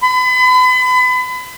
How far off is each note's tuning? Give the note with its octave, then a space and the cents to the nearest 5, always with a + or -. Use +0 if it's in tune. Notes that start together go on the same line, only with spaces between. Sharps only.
B5 +35